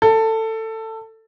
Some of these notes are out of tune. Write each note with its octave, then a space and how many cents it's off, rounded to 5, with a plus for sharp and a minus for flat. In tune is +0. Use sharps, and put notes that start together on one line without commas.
A4 +15